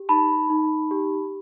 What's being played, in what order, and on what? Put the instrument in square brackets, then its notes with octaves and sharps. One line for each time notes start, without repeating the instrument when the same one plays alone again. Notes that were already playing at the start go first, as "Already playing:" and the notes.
Already playing: [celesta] G4
D#4 A5 B5
D#4
G4